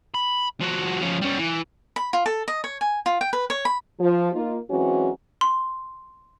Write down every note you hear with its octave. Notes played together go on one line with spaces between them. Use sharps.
B5
F3 F#4
F3 C#4
G3 C#4
E3
B5
F4
A4
D#5
C#5
G#5
F4
G5
B4
C#5
B5
F3
A#3 D#4 F4
E3 F#3 G#3 C4 C#4 F#4
C6